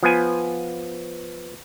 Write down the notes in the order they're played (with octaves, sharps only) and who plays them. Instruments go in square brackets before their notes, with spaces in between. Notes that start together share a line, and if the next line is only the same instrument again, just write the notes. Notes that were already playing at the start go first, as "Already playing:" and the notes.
[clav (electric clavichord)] F3 B3 G#5